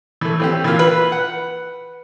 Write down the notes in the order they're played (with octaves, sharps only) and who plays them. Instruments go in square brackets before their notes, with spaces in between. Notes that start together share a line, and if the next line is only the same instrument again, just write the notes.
[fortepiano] E3 A3
E3 C4 G4
E3 A#3 F4
[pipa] B4
[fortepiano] F#5